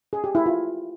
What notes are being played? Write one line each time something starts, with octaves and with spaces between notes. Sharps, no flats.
G#4
G4
E4
F4